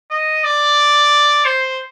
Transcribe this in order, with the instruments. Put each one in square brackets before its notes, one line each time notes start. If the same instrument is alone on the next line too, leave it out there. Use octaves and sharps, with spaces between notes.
[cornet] D#5
D5
C5